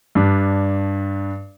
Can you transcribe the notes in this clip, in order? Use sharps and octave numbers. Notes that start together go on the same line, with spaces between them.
G2 D4